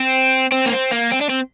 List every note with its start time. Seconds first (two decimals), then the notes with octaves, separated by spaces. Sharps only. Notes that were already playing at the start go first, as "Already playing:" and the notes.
Already playing: C4
0.52 C4
0.66 A#3
0.72 C4
0.91 A#3
1.12 C4
1.21 D4
1.29 C4